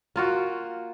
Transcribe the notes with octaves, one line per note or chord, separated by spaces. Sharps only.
A#3 F4 F#4